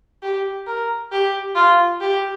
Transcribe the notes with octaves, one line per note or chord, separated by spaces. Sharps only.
G4
A#4
G4
F4
G4